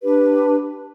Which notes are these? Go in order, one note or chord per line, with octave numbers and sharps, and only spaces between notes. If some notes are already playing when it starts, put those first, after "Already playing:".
D4 G4 B4